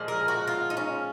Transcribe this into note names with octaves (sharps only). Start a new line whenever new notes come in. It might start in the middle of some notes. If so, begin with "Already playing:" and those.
Already playing: A#2 F3 G#3
A#4
F#4
F4
D#4
C#4